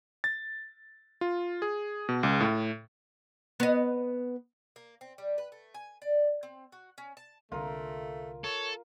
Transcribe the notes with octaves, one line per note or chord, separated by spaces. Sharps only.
A6
F4
G#4
B2
C#2
A2
B3 D#5
A#3
C4
G3
B4
A3
G#5
D5
C4
F#4
C#4
A5
C2 D3 A3 F4 A#4
A4 C#5